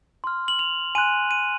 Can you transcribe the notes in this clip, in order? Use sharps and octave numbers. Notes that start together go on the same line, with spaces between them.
C6 F6
F#7
F7
G#5 C6 F#6 D#7
D#7